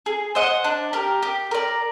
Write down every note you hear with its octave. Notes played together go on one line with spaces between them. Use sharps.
G#4
C5 D#5 F#5
D4
G4 A#4
G4
A#4 D5